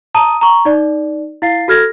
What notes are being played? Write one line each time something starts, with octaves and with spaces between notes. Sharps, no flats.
A5 A#5 D#6 D#7
A#5 C#6
D#4 D5
E4 F5 A6 C7
F#4 A4 F6 G#6 A#6